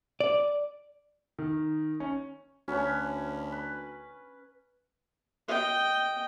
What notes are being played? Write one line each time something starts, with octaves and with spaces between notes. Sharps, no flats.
D5
D#3
C#4
D2 C#4 B4
B4
D#5 G5